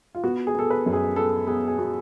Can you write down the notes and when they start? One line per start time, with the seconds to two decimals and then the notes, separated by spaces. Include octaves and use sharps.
0.15 F4
0.24 B3 F#4
0.47 G#4
0.55 B3 A4
0.70 B4
0.86 F#2
0.93 G#4
1.16 B3 A4
1.47 B3 G#4
1.68 G#4
1.78 B3 F#4